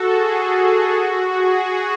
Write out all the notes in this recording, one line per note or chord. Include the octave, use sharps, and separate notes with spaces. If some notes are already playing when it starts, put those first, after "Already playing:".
Already playing: F#4 A4
G#4
F#4
G#4